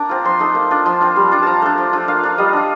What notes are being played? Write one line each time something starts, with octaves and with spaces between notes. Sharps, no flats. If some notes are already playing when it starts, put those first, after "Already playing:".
Already playing: A#3 D4 A#5 D6
C4 F4
F3 C6
A3 D#4
A#3
D4 F4
F3 C6
C4 F4
G3
D4 F4
F3 A5 A#5
A3 D4
F3
A3 D4 F4
A#3 F5
D4 F4
G3 D#5
D4 F4